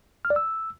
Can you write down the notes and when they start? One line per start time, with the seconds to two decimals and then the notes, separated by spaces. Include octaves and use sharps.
0.25 F6
0.30 D5
0.36 E6